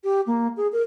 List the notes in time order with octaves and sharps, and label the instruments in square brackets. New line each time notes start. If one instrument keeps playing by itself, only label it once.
[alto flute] G4
A#3
G#4
A#4